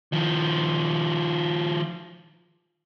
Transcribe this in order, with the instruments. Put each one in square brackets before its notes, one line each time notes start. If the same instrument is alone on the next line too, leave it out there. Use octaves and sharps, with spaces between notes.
[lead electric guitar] D#3 F3